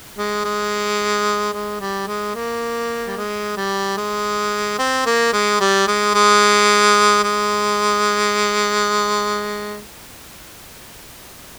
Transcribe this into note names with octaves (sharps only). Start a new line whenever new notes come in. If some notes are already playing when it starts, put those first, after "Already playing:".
G#3
G#3
G#3
G3
G#3
A#3
G3
G#3
G3
G#3
C4
A#3
G#3
G3
G#3
G#3
G#3